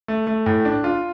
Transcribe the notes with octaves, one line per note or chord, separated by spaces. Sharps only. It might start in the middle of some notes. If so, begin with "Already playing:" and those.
A3
A3
A2
D4
F4